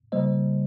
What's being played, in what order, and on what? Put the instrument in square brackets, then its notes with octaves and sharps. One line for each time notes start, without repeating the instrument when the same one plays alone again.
[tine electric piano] C#3 G3 A#3 C5 D#5